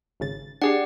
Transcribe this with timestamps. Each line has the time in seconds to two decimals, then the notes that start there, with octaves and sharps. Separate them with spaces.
0.20 G#1 C#3 A6
0.62 D4 G4 G#4 D5 F#5